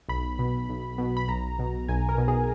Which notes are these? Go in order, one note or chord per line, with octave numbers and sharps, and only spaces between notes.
B1 B5
B2
B1
B2
B5
B1 A#5
B2
B1 G#5
A#4
B2
G#4